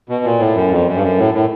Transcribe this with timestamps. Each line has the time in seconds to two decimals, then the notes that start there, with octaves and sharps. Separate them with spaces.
0.09 B2
0.24 A#2
0.39 A2
0.55 F#2
0.71 F2
0.87 F#2
0.95 G2
1.03 F#2
1.19 A2
1.34 A2